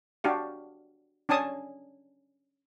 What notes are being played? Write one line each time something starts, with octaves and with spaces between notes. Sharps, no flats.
D4 F#4 G4 F5
C#4 D4 G#5 A5 D#6